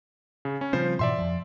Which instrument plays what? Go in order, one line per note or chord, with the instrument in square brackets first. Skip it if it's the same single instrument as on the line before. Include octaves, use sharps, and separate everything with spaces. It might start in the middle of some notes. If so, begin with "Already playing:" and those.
[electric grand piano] C#3
C#4
[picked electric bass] C#3 G3 C4 [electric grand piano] F3 C5
[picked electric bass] G#2 B2 E3 [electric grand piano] D5 E5 C6
[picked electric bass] F2 F3